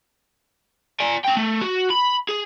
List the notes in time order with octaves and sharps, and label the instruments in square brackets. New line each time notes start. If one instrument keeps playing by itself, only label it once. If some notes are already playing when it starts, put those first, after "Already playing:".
[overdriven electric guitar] D5 G#5
C#4 G5
A3
F#4
B5
G#4